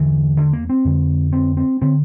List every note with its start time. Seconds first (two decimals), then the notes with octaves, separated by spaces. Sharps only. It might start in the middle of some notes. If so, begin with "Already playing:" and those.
Already playing: E2 D3 E3
0.37 D3
0.53 A#3
0.69 C4
0.85 F2 D3
1.33 C4
1.57 C4
1.82 D3 C4